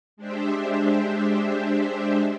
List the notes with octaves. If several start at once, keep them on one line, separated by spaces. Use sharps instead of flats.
G#3 D4 G4 C5 E5